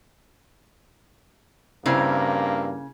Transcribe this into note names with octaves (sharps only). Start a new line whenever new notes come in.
G2 C#3 A#3 C4 E4 A#4